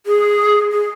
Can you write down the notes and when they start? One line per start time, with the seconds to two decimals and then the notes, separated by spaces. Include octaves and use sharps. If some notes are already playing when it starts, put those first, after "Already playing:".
0.06 G#4
0.72 G#4